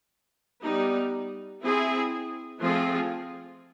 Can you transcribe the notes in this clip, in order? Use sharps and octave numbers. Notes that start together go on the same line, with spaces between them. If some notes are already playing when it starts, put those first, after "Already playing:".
G3 B3 D#4
C4 E4 G#4
F3 A3 C4 F4 G#4